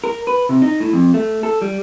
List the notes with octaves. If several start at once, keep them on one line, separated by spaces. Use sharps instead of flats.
A#4
B4
C3
D#4
A2
F2
A3
A4
G3